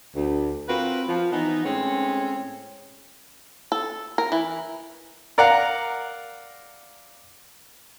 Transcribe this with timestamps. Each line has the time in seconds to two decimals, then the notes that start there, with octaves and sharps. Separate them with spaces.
0.16 D2
0.68 C4 F4 F#4 A#4 B4
1.09 F3
1.32 E3 B3 D#4
1.65 A2 G#3 C4 C#4
3.72 A4
4.18 A#4
4.32 E3
5.38 A#4 D5 F5 F#5 A#5